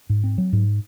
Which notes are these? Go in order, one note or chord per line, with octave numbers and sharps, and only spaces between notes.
G#2
C4
F#3
G#2